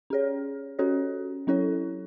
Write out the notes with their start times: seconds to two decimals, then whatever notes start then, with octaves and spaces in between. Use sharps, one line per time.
0.10 C#4 G#4 C#5
0.79 C#4 F#4 A4 C#5
1.47 F#3 C#4 E4 A4 C#5